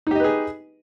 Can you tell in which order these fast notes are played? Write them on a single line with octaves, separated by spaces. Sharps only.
D#4 G4 D#5 B4 G#4